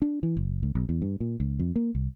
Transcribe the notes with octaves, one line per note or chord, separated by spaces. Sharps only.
D4
E3
F#1
C#2
B1
E2
G2
A#2
C#2
F2
A#3
C2